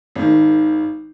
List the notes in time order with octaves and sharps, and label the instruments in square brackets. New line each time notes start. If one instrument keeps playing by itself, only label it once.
[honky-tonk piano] G#1 D#3